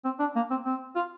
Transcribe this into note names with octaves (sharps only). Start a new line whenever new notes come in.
C4
D4
A#3
C4
C4
F4